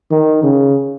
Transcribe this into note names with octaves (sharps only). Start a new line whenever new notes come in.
D#3
C#3